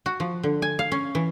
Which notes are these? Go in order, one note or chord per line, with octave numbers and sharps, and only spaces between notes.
F#4
F3
D3
G#5
F5
C#4
E3